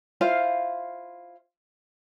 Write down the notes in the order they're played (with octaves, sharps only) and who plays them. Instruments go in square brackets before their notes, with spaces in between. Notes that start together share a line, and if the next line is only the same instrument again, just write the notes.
[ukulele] E4 F4 C5 F5